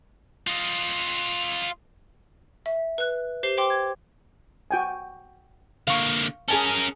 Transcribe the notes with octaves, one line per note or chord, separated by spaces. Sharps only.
F4 D#5
E5
B4 F#6
G4 C5 C7 G7
C5 G5 C6 D6
G#6
F#4 G5 G#5
D3 A#3 F5 C#6
C#4 G#4 A#4 G#5 A5